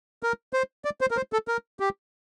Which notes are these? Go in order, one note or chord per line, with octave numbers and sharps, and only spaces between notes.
A#4
C5
D5
C5
A#4
C5
A4
A#4
G4